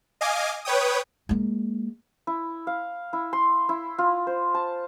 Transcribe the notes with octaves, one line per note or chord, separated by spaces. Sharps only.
D#5 F5 G#5 D6
B4 C#5 G5 D#6
G#3 A#3
E4
F5
E4
C6
E4
F4
C5
A5